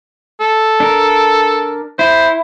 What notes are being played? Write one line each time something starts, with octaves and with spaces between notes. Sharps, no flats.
A4
D4 A#4
E4 C5